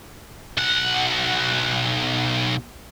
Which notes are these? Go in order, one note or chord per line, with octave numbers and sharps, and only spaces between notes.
B1 F#5